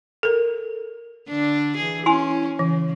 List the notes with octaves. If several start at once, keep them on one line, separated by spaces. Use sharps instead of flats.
A4 A#4
D3 D4
E3 G#4
C#4 E4 G#5 C6
C#3 E3